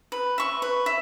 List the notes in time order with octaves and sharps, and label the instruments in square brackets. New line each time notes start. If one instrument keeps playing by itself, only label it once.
[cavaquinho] B4
E5 C#6
B4
E5